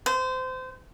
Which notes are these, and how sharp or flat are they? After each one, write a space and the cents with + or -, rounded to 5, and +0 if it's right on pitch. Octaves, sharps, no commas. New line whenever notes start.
C5 -25